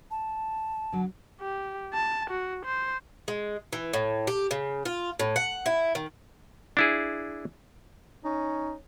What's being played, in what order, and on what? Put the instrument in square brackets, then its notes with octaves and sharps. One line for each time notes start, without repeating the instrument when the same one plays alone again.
[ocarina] A5
[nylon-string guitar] D3 F#3
[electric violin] G4
A5
F#4
C5
[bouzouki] G#3
E3
A2
G4
C#3
F4
A2
F#5
E4
D#3
[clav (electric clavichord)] D4 E4 G#4
[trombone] C#4 [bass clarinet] D#4